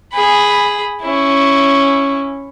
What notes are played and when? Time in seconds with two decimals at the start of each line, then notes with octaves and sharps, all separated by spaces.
0.13 G#4 B5
1.03 C#4 E4